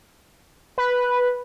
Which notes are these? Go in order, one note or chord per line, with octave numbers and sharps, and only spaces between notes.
B4